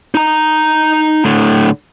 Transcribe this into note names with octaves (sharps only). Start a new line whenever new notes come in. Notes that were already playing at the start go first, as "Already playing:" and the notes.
D#4 A#5
A2 D3